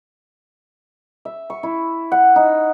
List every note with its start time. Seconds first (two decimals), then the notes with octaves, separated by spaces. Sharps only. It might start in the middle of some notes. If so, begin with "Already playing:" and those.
1.25 E5
1.50 C#6
1.63 E4
2.12 F#5
2.36 D#4